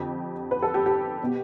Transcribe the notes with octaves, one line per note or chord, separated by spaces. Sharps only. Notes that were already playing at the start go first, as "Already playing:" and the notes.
Already playing: F2 D3 G4
B4
A4
G4
G4
B2